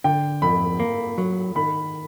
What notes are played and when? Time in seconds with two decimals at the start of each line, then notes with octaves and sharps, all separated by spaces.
0.04 D3 G5
0.42 F2 B5
0.80 A#3
1.18 F#3
1.55 D#3 B5